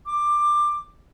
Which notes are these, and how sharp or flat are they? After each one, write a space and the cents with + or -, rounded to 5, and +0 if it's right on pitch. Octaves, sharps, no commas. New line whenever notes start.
D6 +15